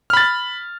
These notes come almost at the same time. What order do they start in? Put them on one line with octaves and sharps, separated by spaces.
F6 B5 A6